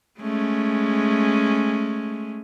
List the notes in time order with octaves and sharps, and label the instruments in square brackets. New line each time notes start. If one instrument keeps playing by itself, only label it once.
[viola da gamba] G#3 A3 C#4